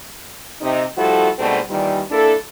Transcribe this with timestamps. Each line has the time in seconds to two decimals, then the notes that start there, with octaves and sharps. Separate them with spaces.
0.61 C3 D#4
0.97 F3 G3 A3 E4 F#4 A4
1.38 G#2 B2 D3 G3 A3 C4
1.69 A#2 D#3 E3 G3
2.10 A#3 D4 E4 A4